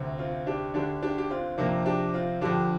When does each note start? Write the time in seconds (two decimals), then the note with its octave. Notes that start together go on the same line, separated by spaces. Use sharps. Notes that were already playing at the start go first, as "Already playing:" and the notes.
Already playing: D2 C3
0.18 C4 F4
0.47 D4 G4
0.74 D2 D3 D4 G4
1.03 D4 G4
1.18 G4
1.30 C4 F4
1.58 F2 C3 A#3 D4
1.86 D4 G4
2.14 C4 F4
2.41 F2 D3 D4 G4